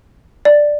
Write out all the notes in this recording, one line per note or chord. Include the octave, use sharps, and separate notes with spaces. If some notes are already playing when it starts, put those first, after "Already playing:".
D5